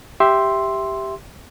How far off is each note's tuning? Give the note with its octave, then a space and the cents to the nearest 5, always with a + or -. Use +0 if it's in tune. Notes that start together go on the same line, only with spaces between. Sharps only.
G4 +0 E5 +0 C6 +0